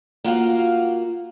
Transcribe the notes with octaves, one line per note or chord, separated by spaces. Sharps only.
A#3 F4 F#4 F5